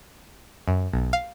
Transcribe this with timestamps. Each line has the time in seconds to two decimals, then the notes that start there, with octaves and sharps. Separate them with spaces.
0.68 F#2
0.93 B1
1.13 F5